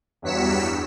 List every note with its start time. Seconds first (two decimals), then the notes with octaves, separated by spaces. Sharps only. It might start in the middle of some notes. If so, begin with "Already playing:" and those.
0.22 E2 G2 F#3 B6 C#7 E7